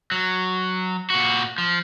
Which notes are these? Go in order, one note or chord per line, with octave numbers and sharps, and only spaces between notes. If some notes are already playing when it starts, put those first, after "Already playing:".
F#3
A#2 F#4
F3